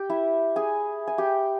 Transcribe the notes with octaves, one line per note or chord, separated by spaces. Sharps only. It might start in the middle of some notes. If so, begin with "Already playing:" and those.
Already playing: G4 G5
E4 E5
G#4 G#5
G#5
G4 G5